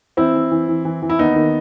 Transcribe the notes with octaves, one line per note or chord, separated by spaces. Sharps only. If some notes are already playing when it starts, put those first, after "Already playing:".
E3 C4 E4
E3
E3
E3
E3
E3
E4
D#2 B3 D#4
D#3